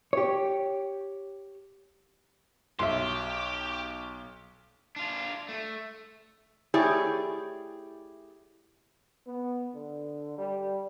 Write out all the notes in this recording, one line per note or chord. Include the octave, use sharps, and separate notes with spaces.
G4 C#5
B1 G4 E5 C6
D4 F4
A3
A3 E4 G4 G#4 C#5 D5
B3
D3
G3